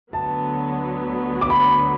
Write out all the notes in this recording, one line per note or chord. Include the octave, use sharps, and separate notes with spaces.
D2 D3 F#3 B3 A5
D6
B5